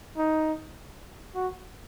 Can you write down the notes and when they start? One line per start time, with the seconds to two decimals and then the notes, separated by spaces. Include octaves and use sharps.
0.17 D#4
1.35 F#4